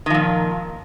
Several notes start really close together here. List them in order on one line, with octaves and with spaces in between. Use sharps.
D#3 F3 A#2